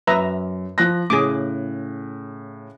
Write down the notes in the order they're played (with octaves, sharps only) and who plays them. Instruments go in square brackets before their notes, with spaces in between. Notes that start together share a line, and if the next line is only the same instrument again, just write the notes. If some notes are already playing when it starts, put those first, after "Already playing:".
[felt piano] F#2 [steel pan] B4 E5 A#5
[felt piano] F3 F#6 A#6
[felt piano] A2 C#3 [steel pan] G#4 D6